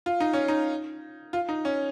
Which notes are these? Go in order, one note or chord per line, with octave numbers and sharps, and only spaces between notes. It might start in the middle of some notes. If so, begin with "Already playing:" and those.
F4
D#4
C#4
D#4
F4
D#4
C#4